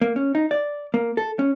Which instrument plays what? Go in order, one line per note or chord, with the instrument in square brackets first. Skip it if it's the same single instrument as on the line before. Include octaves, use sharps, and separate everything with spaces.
[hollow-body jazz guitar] A#3
C#4
D#4
D5
A#3
A4
C#4